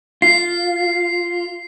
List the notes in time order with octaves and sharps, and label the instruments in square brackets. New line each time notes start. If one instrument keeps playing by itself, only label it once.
[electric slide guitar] F4 [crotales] C7